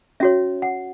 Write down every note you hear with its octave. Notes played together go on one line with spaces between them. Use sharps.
C#4 F#4 C#5 E5
F#5